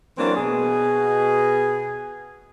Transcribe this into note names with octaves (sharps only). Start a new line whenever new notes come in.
E3 F#3 A#3 C4 D4
B2 G#4